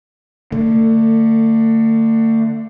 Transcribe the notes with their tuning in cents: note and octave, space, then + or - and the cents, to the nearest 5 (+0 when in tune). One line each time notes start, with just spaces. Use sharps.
D3 +25 A3 +40